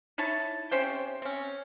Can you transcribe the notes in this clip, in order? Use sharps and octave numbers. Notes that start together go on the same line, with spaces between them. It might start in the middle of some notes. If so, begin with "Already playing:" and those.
D#4 E4 C#5 A5
C3 C#4 C5 G5
C4 C#4